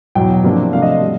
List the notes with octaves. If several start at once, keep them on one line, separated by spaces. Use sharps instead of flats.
E2 B2 F#3 G5
C3 F3 A#3 D4
C3 F3 A3 D4 F5
D#5
G3